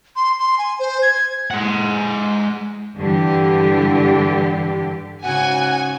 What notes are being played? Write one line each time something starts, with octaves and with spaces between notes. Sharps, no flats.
C6
C6
G#5
C5
G#6
G#6
G#3 F#5
G2 D3 E3 G4
G#2 C#3 F#4 F#5 G#5